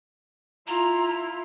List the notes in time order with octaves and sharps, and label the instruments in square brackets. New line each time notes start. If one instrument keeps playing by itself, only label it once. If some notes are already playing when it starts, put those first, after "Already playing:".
[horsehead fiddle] E4 F4 [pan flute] A#5